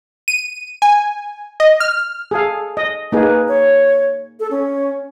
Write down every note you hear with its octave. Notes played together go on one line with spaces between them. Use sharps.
D#7
G#5
D#5
F6
G#4 A4 F5
D#5
A#3 D#4 G#4 B4
C#5
A4
C#4